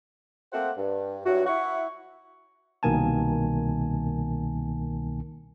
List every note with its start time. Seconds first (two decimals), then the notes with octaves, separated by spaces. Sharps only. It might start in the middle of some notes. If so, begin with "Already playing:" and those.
0.53 A3 A#3 C4 C5 F#5
0.78 G2
1.26 G2 F#3 E4 F#4
1.47 E4 F#5 C#6
2.83 C2 B2 D#3 A#3 G#5 A5